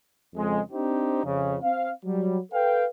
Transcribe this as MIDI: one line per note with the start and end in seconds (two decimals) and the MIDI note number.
0.36 0.59 41
0.36 0.59 49
0.36 0.59 56
0.71 1.21 60
0.71 1.21 62
0.71 1.21 63
0.71 1.21 67
0.71 1.21 72
1.24 1.56 41
1.24 1.56 49
1.61 1.89 60
1.61 1.89 77
2.04 2.38 54
2.04 2.38 55
2.52 2.85 69
2.52 2.85 71
2.52 2.85 77
2.52 2.85 79